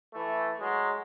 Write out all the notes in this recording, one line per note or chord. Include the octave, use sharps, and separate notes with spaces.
E3 A3
F#3 G#3